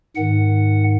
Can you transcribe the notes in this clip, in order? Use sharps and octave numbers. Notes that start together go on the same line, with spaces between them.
G#2 D#3 F#5